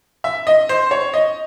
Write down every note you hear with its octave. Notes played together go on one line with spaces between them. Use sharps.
E5
D#5
C5
C#5
D#5